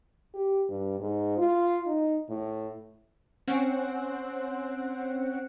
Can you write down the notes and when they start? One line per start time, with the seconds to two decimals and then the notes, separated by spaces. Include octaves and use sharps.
0.35 G4
0.69 G2
1.00 G#2
1.38 F4
1.87 D#4
2.30 A2
3.48 C4 C#4 F#5